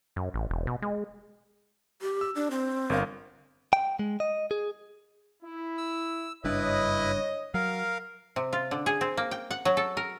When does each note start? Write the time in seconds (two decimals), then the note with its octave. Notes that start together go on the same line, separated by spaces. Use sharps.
0.16 F#2
0.34 A1
0.50 E1
0.67 B2
0.82 G#3
2.01 G4
2.21 E6
2.36 D4
2.51 C4
2.90 G1 A#4 F5
3.73 G5
3.99 G#3
4.20 D#5
4.51 G#4
5.43 E4
5.78 E6
6.44 F#1 G2 D4 E4 B4 C#5 D#5
7.54 F#3 A#4 F5
8.36 C3
8.53 F4
8.71 D3
8.86 G#4
9.01 C4
9.17 A#3
9.31 G5
9.51 F#5
9.65 F#3
9.77 A4
9.97 A#4